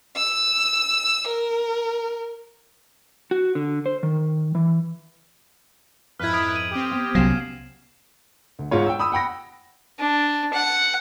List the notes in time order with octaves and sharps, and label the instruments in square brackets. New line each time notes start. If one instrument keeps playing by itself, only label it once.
[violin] E6
A#4
[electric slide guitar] F#4
D3
C5
D#3
E3
[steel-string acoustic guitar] F2 G#2 [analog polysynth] E4 B4 [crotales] F6 G#6
[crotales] D#6 G#6 D7
D#7 F#7
[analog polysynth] C4 G4
[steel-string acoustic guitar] B3
[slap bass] C2 F#3 [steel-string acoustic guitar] A#3 C#4 F#5 [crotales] F6 C7 E7
[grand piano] D2
G#2 G#3 F4 C#5
G5 E6
B5 D#6 E6
F#5 G5 B5 A#6
[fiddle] D4
F#5